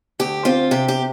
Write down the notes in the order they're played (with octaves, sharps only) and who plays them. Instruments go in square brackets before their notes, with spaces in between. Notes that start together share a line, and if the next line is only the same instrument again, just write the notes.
[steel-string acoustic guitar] D2 G4
C4 F4
C3 G4
G4